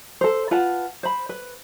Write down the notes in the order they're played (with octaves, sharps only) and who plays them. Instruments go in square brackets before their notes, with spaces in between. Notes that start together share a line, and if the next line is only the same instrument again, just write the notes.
[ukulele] A4 C5
F4 B4 F#5 A5
C5 B5
B4